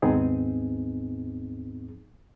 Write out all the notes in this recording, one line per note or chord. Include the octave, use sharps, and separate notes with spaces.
D#2 G#2 B3 C4 D#4 G#4